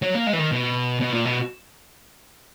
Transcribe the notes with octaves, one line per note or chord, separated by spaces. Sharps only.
F#3
A#3
G#3
E3
D#3
B2
B2
A#2
B2